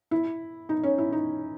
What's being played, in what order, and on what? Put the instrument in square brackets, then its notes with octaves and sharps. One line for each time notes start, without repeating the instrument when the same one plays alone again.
[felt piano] E4
D#4
C#4
E4
D#4